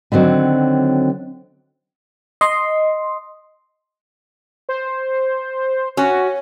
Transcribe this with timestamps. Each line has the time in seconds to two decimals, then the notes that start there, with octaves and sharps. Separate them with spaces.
0.12 D3 D#3 F#3 C4
2.41 D#5 C6
4.69 C5
5.97 C#4 F#4